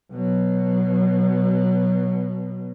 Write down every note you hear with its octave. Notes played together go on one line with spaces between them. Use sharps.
B2 F#3